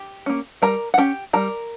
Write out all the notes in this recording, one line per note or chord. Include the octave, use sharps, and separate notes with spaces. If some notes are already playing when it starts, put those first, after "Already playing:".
Already playing: G4
A#3 C#4
G3 A#4 A#5
F#5
C#4 G4 G5
G3 A#4 A#5